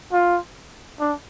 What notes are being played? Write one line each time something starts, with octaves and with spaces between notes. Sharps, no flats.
F4
D4